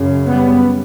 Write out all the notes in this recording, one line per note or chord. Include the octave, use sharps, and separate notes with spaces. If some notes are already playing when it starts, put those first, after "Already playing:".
Already playing: F#2 C#3
G3 B3